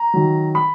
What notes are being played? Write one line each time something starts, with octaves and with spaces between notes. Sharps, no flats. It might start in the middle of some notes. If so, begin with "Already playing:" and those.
Already playing: A#5
D#3 F#3
B5